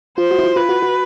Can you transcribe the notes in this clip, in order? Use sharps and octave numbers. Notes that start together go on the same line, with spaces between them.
F4 C5
F#4
E4
F4
F4 B4
F#4
F#4